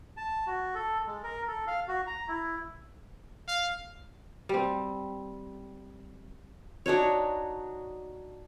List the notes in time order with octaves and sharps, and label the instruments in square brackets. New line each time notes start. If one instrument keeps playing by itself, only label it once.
[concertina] A5
F#4
A4
G#3
A#4
A4
F5
F#4
A#5
E4
[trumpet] F5
[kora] G3 C4
[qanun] D4 D#4 F#4 C#5